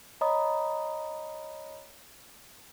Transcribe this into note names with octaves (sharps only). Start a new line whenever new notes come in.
C#5 D#5 A#5 B5 D#6